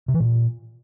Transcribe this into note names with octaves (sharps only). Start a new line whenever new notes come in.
C3
E3
A#2